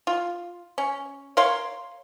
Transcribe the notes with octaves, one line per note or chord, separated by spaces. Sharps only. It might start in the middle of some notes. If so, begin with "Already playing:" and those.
F4
C#4
A#4 C#5 F5 C6